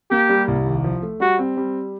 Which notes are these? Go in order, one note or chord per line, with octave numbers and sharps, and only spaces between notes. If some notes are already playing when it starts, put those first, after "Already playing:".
A#3 G4
G3
C2
D#2
F3
A3
G3 F#4
C4
G3